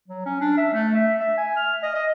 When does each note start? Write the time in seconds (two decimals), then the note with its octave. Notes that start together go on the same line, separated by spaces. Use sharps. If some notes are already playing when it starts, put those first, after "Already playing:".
0.08 F#3
0.26 C#4
0.41 D4
0.57 E5
0.73 A3
0.95 E5
1.20 E5
1.37 G#5
1.57 F6
1.83 D#5
1.95 D#5